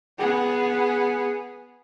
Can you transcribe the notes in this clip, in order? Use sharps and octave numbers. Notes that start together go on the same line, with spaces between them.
B3 G#4